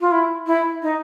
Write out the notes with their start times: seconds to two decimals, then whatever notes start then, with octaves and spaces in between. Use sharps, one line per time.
0.01 F4
0.11 E4
0.47 E4
0.83 D#4